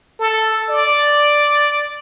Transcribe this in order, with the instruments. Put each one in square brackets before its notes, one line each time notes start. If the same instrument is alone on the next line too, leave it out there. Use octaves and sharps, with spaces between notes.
[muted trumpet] A4
D5